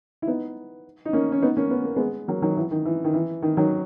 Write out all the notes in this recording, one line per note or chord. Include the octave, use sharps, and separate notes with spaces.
E4
B3 D#4
D#4
A#3 C#4
C#4
B3 D#4
A#3 C#4
B3
A#3
G#3 B3
F#3 A#3
D#3 F#3
E3
D#3
E3
D#3
E3
D#3
D#3 F#3